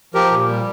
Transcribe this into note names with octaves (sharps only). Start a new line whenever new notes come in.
F3 G4 A#4
A#2
G3